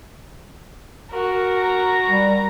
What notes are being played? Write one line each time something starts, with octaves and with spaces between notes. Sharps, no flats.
F#4 A#4
A#5
G3